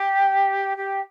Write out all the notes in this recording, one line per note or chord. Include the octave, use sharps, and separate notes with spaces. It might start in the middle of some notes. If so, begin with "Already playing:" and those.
Already playing: G4
G4